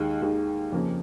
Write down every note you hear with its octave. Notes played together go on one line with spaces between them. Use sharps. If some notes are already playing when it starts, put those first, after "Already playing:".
Already playing: D#2 D#3 G#3
D#2 D#3 G#3
F2 C#3 F3 A#3